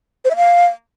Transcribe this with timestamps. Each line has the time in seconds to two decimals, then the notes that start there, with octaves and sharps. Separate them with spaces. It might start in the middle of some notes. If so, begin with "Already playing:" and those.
0.25 C5
0.30 E5
0.36 F5